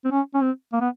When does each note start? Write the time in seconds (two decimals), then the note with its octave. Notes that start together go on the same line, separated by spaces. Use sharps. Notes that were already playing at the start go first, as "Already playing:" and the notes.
0.05 C4
0.12 C#4
0.35 C#4
0.42 C4
0.73 A#3
0.81 B3